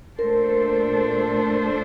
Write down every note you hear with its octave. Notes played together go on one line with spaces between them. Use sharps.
A#2 A3 D4 A4 A#4 C5